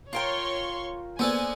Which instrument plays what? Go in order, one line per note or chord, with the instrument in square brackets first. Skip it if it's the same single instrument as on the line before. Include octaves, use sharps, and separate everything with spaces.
[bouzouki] F4 A#4 G5 [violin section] C#5 C6 C#6
[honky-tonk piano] A#3 B3 [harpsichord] D4 A4 C5 [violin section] G#5